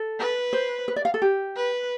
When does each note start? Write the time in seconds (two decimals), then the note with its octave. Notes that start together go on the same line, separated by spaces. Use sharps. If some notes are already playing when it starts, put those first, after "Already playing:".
Already playing: A4
0.19 B4
0.53 C5
0.88 B4
0.96 D5
1.05 F5
1.14 A4
1.22 G4
1.56 B4